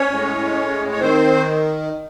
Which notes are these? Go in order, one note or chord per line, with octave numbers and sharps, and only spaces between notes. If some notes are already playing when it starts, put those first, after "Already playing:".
Already playing: C#4 C#5
A2 G#3
C#5
D#3 C4 C5